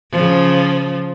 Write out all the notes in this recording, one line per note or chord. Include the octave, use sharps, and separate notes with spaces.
C#3 F3